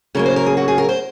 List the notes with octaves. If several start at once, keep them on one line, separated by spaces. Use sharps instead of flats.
C#3 F#3 A#3 A#4
C5
A#4
G#4
F#4
G#4
A#4
C5